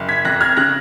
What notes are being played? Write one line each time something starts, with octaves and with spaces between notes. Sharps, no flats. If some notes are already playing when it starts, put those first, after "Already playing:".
Already playing: F#1
G#6 B6
F2 F#6 A#6
F6 G#6
C#3 F#6 A#6